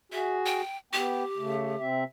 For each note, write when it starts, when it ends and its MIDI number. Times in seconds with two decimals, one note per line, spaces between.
0.12 0.62 66
0.12 0.62 68
0.12 0.36 76
0.46 0.77 79
0.93 1.24 59
0.93 1.85 67
0.93 1.24 79
1.37 1.76 49
1.37 1.76 57
1.79 2.04 48
1.79 2.04 60
1.79 2.04 76